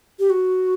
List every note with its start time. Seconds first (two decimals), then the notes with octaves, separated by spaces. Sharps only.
0.19 G4
0.30 F#4